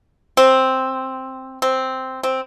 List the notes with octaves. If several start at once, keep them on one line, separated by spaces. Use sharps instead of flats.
C4
C4
C4